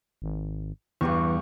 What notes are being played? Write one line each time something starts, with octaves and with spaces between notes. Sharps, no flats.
G#1
E2 G2 E3 G4 C#6